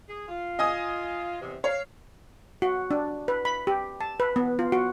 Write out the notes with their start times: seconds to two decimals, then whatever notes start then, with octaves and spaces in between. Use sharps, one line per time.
0.08 G#4
0.28 F4
0.59 D#5 G#5 D#6
1.41 E2 C3
1.64 C#5 F5
2.62 F#4
2.91 D4
3.28 B4
3.45 B5
3.67 G4
4.01 A5
4.20 B4
4.36 B3
4.59 F4
4.72 F#4